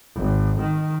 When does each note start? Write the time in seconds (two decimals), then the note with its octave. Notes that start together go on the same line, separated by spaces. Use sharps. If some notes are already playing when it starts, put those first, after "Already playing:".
0.16 G#1
0.61 D#3